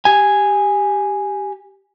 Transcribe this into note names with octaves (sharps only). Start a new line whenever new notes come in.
G4 G#5